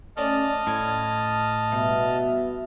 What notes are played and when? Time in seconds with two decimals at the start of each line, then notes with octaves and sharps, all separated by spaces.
0.17 A3 C#4 D5 D#5 A5 F6
0.67 A2 G#6
1.72 B2 G3 B3 E5